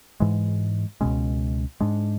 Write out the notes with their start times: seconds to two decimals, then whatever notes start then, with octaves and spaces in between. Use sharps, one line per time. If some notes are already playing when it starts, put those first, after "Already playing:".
0.20 G#2 E3 G#3
1.01 C#2 B2 G#3 C#4
1.80 G#2 G#3 D4